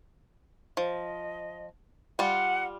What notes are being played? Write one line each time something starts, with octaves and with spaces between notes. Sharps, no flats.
F3 D#5
G3 F4 F#5